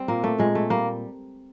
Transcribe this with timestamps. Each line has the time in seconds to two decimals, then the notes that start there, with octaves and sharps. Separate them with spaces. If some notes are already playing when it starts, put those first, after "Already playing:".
Already playing: G3 C4
0.08 A#2 A#3
0.24 A3
0.38 A#2 G#3
0.55 A3
0.70 G3 A#3